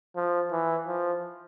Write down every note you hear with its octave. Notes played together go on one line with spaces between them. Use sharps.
F3
E3
F3